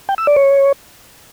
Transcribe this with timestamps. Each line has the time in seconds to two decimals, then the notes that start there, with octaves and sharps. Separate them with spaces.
0.09 G5
0.18 E6
0.27 D5
0.36 C#5